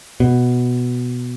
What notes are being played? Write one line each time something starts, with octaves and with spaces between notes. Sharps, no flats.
B2